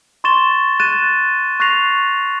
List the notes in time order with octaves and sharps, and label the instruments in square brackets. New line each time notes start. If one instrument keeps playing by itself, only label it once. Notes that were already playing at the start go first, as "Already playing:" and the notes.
[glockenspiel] C6 C#6 A6 E7 G7
F#6 A6 D#7 E7
C#6 F#6 A6 A#6 C7 F7